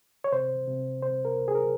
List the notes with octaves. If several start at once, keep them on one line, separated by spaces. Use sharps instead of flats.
C#5
C3 C5
C3
C3 C5
A#4
C#2
G#4
A#4